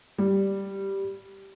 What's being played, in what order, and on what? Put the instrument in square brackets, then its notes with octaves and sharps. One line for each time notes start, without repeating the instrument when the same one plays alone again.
[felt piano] G3